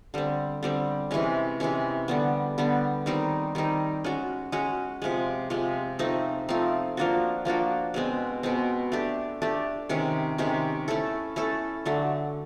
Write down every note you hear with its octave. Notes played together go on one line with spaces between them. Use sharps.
D3 G3 C4
D3 G3 C4
C3 E3 G#3 C#4
C3 E3 G#3 C#4
D3 G3 B3
D3 G3 B3
D#3 G3 C4 D#4
D#3 G3 C4 D#4
G#3 C#4 F#4
G#3 C#4 F#4
C3 F3 G#3
C3 F3 G#3
F3 A3 C4 D#4
F3 A3 C4 D#4
F3 A#3 D4 F#4
F3 A#3 D4 F#4
B2 G#3 C4
B2 G#3 C4
A3 D4 G4
A3 D4 G4
C3 D#3 G#3 C#4
C3 D#3 G#3 C#4
A3 C#4 E4 A4
A3 C#4 E4 A4
D3 F#3 A3